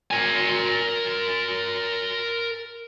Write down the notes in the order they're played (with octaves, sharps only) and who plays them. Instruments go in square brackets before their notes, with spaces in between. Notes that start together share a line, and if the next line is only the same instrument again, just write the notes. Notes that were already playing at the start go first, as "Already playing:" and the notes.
[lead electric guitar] A#4 G#5